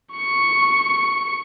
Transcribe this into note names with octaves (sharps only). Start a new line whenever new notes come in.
C#6 C#7